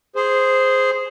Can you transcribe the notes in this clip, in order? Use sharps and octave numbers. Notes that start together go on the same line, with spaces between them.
G#4 C5